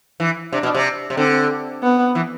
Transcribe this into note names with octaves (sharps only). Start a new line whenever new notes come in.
E3
C3 D4
B2
C3
C3
D3 C4
B3
E3